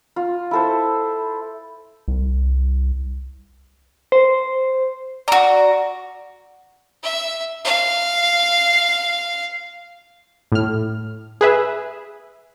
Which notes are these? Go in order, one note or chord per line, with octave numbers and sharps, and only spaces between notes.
F4
E4 A4 C5
C2
C5
F#4 D5 A#5
E5
F5
A2 F6
G#4 B4 E5